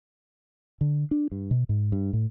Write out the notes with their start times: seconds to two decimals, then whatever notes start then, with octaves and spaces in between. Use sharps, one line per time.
0.81 D3
1.11 D4
1.32 G2
1.51 B2
1.69 G#2
1.92 G2
2.13 A2